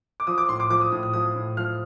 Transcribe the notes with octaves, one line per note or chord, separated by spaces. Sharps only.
D6
F3 D#6
D6
A2 C6
D6
F3 D6
D#6
A2 D#6
D#6
F3 D#6
A2
F3 F6